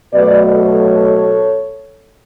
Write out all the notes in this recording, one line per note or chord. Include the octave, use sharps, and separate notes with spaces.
B2 F#3 A3 B4 D5
A4 C#5